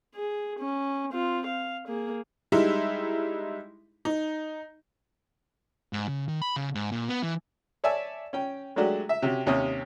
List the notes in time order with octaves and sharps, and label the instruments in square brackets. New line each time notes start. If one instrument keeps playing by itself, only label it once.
[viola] G#4
C#4
C4 F4
F5
A#3 G#4
[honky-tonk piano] G3 G#3 D#4 E4
D#4
[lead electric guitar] G#2
C#3
D#3
B5
C#3
G#2
A#2
B3
E3
[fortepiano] C#5 D5 E5 G#5 A5 E6
C#4 G5
F#3 G#3 A3 D4 F#4 G4
E5
C3 C#4 F#4 G4
D#2 C3 C#4 C#5 D#6